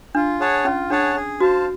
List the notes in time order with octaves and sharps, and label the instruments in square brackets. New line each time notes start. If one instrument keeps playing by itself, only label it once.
[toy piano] D4 [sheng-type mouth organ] F4
[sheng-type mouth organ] G#4 C#5 F#5 A5
[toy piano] C#4 [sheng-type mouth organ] F4
[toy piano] D4 [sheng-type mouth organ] G#4 C#5 F#5 A5
[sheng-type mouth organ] G#4
[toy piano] F#4 [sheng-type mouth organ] C5 F5 A5